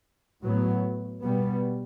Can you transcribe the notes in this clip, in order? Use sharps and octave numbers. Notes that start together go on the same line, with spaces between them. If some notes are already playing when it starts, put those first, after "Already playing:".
A2 F#3 B3
B2 G3 B3